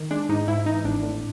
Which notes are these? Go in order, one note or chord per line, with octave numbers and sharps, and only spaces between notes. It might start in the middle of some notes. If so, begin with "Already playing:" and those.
Already playing: D#3
G#3 D4
G#2 D#4
G#2 E4
E3 D#4
G#1 D4
A2